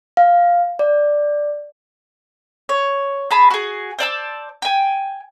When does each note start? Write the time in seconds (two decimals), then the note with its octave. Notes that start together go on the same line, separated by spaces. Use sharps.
0.17 F5
0.79 D5
2.69 C#5
3.31 G#4 A5 B5
3.51 F#4 G#4
3.99 C5 D5 A5 E6
4.62 G5 G#5